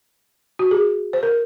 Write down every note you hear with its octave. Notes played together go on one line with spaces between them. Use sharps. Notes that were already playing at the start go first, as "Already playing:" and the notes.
F#4
G#4
C5
A#4